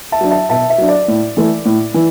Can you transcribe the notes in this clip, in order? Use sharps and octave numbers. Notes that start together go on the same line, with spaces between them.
E5 A5
F#3 D4
E5 A5
B2 E5 A5
E5
F#3 D4
D5
A2
E3 A3
A2
E3